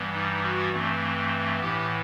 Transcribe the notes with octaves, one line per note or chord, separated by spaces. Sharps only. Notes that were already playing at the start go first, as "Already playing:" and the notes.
Already playing: G2 E3 G3 B3
D#4
F#4
G2 E3 A3 C4
A2 E3 B3 G4